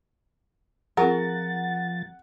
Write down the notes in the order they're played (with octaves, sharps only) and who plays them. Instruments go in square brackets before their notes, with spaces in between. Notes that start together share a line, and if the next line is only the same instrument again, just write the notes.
[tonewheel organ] F3 A6 [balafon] C4 F4 G#4 [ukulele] A#4 [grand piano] F#5